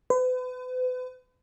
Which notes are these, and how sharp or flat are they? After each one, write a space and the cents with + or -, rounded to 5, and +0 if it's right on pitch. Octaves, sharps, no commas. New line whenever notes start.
B4 +40